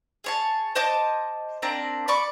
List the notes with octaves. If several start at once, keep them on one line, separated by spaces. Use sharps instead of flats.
G#4 C#5 A5
C5 D#5 A5 D6
A#3 C4 D4 A#5
D5 B5 C#6 D6